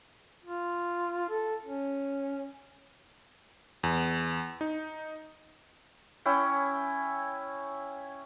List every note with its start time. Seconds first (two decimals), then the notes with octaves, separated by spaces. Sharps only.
0.44 F4
1.29 A4
1.65 C#4
3.83 E2
4.61 D#4
6.26 C#4 E4 G5 G#5